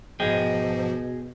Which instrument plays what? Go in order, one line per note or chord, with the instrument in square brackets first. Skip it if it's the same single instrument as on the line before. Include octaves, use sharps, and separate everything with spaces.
[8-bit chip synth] G#2 F3 [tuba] B2 [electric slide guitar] G#4 D#5 G5